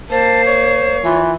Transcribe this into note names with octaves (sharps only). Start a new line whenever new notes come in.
A#3 C5 A5 C7
C#5
E3 F4